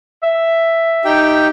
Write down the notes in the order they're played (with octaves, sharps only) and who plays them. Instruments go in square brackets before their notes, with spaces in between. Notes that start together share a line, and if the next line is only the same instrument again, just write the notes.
[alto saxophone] E5
[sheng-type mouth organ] D#4 G4 G5